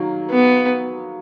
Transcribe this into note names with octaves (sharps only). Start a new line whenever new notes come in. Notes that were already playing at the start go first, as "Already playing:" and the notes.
Already playing: D#3 F#3 A#3
B3